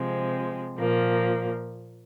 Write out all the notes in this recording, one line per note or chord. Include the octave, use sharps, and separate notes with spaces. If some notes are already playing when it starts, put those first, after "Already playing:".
Already playing: C3 F3 G#3 C4
A#2 F3 A#3